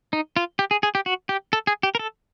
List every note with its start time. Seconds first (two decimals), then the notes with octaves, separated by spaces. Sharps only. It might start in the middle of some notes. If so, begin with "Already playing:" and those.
0.13 D#4
0.36 F4
0.59 G4
0.71 G#4
0.83 G#4
0.95 G4
1.06 F#4
1.29 G4
1.53 A4
1.67 G#4
1.83 G4
1.95 A#4
1.99 A4